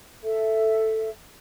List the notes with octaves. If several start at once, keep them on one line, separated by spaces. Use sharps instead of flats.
A4 E5